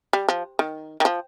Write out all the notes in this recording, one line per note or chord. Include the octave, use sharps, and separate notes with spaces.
G3
F3
D#3
D#3
F3